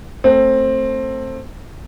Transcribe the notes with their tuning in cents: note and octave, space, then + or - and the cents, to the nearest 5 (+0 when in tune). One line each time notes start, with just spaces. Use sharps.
A3 +20 C4 +15